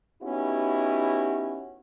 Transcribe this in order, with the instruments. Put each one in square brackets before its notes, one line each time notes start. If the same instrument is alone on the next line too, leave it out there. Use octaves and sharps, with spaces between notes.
[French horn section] B3 C#4 D#4 E4 F#4 G4